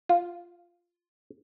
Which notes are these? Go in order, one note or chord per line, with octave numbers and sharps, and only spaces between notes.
F4